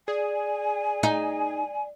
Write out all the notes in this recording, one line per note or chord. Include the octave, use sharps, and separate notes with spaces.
G#4 D5 G#5
D#4